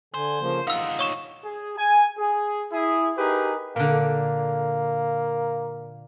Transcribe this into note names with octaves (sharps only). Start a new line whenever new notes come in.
D3 C5 G#5
C#3 F3 A#3
D#4 F4 F5 F#5 E6
C#5 C#6 E7
G#4
G#5
G#4
E4 G#4
D#4 G4 G#4 A#4 B4
A#2 D3 A#3